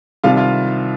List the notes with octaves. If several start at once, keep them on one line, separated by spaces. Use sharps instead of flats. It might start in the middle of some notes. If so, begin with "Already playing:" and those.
C2 C3 D#3 G3 F4 F5
F4 F5